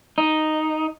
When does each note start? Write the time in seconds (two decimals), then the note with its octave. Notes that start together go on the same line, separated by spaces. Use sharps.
0.18 D#4